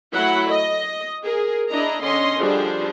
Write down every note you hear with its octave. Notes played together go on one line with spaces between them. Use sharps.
F#3 A3 E4 F#5 B5
D#5
G#4 A#4
D4 E4 D#5 A#5
D3 C#4 D#5 C6
D3 F3 G3 D4 G#4 C5